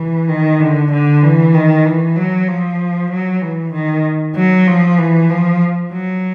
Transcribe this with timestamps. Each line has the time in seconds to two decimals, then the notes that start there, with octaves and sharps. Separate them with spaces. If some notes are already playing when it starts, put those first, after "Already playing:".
Already playing: E3
0.29 D#3
0.60 D3
0.91 D3
1.23 E3
1.54 D#3
1.85 E3
2.16 F#3
2.47 F3
3.10 F#3
3.42 E3
3.72 D#3
4.36 F#3
4.67 F3
4.98 E3
5.29 F3
5.92 F#3